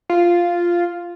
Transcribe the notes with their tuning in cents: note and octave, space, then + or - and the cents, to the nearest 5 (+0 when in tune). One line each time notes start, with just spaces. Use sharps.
F4 -5